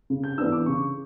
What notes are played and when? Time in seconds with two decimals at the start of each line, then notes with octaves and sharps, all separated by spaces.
0.10 C#3
0.24 G6
0.38 D4 E6
0.41 E3 B3
0.52 D6
0.66 C#3 C#6